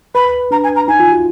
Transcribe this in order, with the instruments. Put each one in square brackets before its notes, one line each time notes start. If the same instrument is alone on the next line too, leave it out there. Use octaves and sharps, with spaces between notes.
[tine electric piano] B4 [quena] B5
[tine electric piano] D4 [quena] A#5
[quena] G#5
A#5
[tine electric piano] D#4 [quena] G#5
[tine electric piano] F4
F#4